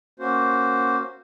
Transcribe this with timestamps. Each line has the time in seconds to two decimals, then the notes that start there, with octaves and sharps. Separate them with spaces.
0.20 A#3 C#4 F#4 C5